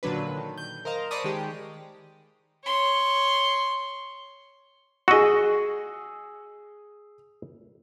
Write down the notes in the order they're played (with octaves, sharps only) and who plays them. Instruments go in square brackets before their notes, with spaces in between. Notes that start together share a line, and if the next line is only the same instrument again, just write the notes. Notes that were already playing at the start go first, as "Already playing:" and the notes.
[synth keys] A#2 D3 F#3 D4 B4
D#3
G6
A#4 C5 D#5 F5 A#5
C5 D5 A5 B5 C#6 D#6
D#3 G#3 G4
[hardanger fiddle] C#5 C6
[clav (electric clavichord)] F#4 D#5 [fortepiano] G#4 E6